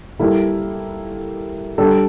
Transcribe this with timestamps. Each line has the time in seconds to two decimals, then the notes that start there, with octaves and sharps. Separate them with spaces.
0.19 G3 A#3 E4 A4
1.78 G3 D4 A4